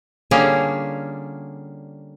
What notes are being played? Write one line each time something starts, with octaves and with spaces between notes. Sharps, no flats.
D3 G3 A#3 C#4 F4 G#4